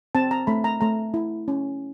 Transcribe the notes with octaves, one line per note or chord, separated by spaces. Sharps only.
C4 A5
A#5
A3 B5
A#5
A3 A#5
E4
C#4